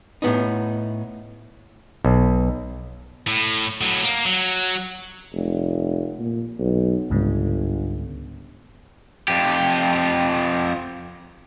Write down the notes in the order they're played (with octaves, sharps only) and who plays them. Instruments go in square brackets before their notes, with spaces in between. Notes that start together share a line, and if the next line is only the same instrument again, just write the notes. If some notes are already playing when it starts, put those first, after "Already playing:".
[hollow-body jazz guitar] A2 B3 D#4
[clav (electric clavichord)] B1
[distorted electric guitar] A2
A2 F#3
A#3
F#3
[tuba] F1
A#2
B1
[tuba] G1 [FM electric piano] C#2 G#2 C#3
[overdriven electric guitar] F2 G4